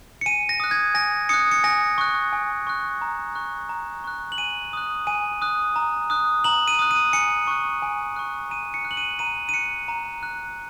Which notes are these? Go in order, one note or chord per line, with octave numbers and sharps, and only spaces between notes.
C#7
G#5 D#7
A#6
D#6 F#6
G#6
G#5 A#6
D#6 F#6 C#7
C#7
G#5 A#6
C#6 F#6
G#5
C#6 F#6
A#5
C#6 F#6
A#5
C#6 F#6
F#7
G#5 D#7
D#6 F#6
G#5 D#7
D#6 F#6
A#5
D#6 F#6
A#5 F#7
D#7
D#6 F#6
D#7
G#5 C#7
C#6 F#6
G#5
C#6 F#6
A#5 D#7
C#7
F#6
F#7
D#7
A#5 D#7
D#7
F#6 C#7
A#5
F#6